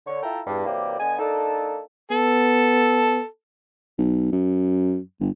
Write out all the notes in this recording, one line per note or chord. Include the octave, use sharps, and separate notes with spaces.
D3 C#5
E4 F4 A4 E5 G5 A#5
E2 G2
F#2 C3 E3 A#3 G4 D5
D3 B3 D#5 G#5
A#3 D4 D#4 A4
B3 A4
B1
F#2
G1